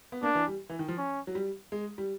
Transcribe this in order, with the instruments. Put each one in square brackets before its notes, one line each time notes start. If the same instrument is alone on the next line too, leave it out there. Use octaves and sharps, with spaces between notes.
[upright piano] B3
[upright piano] A#3 [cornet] D4
[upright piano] E3
G3
E3
D#3
F3
[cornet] C#4
[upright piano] F#3
G3
G#3
G3